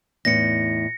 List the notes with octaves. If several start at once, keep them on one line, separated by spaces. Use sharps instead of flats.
E2 A2 D#4 A#6 C#7